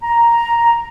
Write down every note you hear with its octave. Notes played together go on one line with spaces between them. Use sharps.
A#5